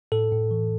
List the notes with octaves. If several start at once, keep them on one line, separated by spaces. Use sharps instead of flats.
A2 A4
A2
E3